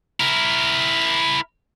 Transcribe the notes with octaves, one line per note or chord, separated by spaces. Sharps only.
E4 A#4